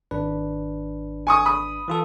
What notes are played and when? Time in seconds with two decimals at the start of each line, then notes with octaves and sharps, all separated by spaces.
0.11 G#1 D4 B4
1.27 G#5 C#6 D#6
1.46 B5 D#6
1.88 E3 F4 A4